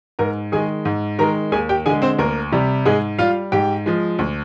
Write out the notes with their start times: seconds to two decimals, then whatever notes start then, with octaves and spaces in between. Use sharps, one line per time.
0.19 G#2 A#4 A#5
0.52 D#3 G#3 G#4 G#5
0.85 G#2
1.19 D#3 G#3 A#4 A#5
1.52 D#2 G#4 G#5
1.69 G4 G5
1.86 D3 G#3 G#4 G#5
2.02 C4 C5
2.18 D2 A#3 A#4
2.52 C3 G3
2.86 G#2 G#3 G#4
3.18 G3 F4 F5
3.52 G#2 G4 G5
3.86 F3 G#3
4.19 D2